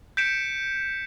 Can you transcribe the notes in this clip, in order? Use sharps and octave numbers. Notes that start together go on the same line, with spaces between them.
G6 B6 C#7 D7 E7